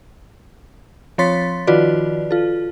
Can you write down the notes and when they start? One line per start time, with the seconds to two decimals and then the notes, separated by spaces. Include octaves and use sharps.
1.18 F3 C4 C#5 C6 A6 B6
1.67 D#3 F3 F4 F#4 B4 D5
2.31 F4 A4